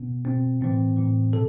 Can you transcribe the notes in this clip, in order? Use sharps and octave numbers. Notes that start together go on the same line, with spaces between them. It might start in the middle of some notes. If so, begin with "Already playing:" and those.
Already playing: B2 B3
B2 C4
A2 E3 C4
A2 E3
B2 A4